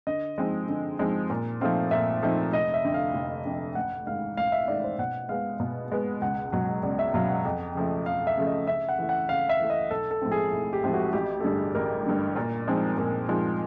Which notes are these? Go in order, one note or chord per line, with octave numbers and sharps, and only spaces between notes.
D3 D#5
F3 G#3 C4 D#4
D3
F3 G#3 C4 D#4
A#2
F3 A3 C4 D#4 F5
A#2 E5
F3 A3 C4 D#4
F1 D#5
E5
F2 D3
F5
F1
F2 D3
A1 F#5
G#2 D#3 F5
A1 F5
E5
G#2 D#3 D5
C5
B2 F#5
G#3 B3 F5
B2
G#3 B3
C#2 F#5
B2 F#3 F#5
C#2 D5
E5
B2 F#3 F5
F#5
F2
C#3 F3 A3
F2 F5
E5
C#3 F3 A3
D#5
C#3 E5
F#5
E3 A3
F#5
C#3 F5
E5
E3 A3
D#5
B1 A4
A4
A2 F3 G#3 C4
G#4
B1
G4
A2 F3 G#3 C4
F#4
A1 G4
A4
G2 D3 G#4
A1 A#4
G2 D3
A#2
F3 G#3 C4 D#4
A#2 A#4
F3 G#3 C4 D#4 F4